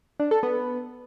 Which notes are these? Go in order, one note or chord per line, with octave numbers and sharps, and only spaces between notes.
D4
A4
B3